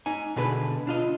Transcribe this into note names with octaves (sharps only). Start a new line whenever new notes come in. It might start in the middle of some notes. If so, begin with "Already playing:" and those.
D#4 G#5
B2 D3 D4 G#4 B4
D4 F4 D#5